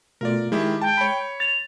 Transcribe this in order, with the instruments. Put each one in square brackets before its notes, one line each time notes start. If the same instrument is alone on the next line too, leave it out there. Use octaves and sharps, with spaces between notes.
[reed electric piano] B2 A3 F4 [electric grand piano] A#4 D5
[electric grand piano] D#3 E4 G4 [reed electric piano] G#3
[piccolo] G5 [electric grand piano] A5
[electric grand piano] C#5 B5
[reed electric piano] A6 [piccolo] F7